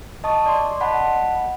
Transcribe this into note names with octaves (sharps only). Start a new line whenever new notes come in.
D#5 A5 C#6 D#6
D5 C6
D#5 F#5 A5 B5